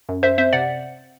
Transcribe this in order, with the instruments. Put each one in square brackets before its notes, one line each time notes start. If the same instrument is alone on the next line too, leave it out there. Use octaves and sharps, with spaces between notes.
[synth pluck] F#2
F#2 C5 E5
C4 C5 E5
C3 D5 F#5